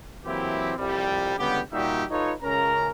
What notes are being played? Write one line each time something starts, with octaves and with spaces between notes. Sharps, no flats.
E3 F#3 A#3 C4 E4 G4
C2 F2 C3 G3
C#2 D3 G3 B3 G4
A#2 G3 D#4 F#4 G4 E5
D#4 F4 A4 B4 C#5
C#2 C#3 C#4 A#4 A#5